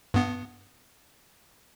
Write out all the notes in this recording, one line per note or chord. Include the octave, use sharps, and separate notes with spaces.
G2 B3